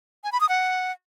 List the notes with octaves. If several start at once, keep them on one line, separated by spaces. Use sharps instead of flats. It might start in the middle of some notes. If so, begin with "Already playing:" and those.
G#5
B5
D#6
F#5